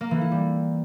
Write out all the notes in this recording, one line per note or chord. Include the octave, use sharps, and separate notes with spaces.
A#3
E3
E4
G3